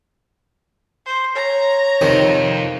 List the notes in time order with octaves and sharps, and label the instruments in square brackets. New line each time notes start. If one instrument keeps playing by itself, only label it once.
[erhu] C5
[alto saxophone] C#5 [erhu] A#5
[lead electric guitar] F2 F4 [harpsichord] C3 D#3